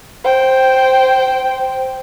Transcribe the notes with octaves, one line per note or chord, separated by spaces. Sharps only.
C5 G5